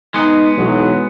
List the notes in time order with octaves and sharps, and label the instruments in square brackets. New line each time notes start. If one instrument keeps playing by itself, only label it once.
[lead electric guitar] G#3 B3 [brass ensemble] D#4
[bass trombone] B1 [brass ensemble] E3 F#3